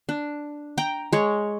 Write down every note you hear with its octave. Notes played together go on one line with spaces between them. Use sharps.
D4
G5 A#5
G#3 C#5